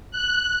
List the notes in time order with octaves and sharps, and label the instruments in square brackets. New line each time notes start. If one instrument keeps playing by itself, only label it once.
[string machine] F#6